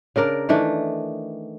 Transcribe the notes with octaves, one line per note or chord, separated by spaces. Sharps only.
C#3 D4 A#4 D5
D#3 E3 A3 D4